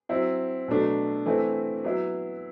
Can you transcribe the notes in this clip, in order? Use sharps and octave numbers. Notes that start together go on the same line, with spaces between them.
F#3 C4 E4
B2 F#3 A3 D4
E3 A3 C4 E4
F#3 B3 E4